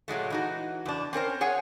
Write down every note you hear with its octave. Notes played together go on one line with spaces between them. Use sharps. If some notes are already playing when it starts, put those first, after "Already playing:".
A#2 F#3 G#3 A3
E3 D#4 F#4
E2 D4
C4 C#4 A#4 C5
G#4 C#5 F#5 G#5